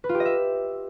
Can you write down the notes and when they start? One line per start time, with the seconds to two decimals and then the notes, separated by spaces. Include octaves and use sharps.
0.04 B4
0.09 F4
0.15 G4
0.20 D#5
0.25 E5